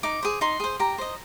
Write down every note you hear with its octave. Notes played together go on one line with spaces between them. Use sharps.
D#4 D6
G#4 C5
D#4 C6
G#4 C5
G4 A#5
C5 D#5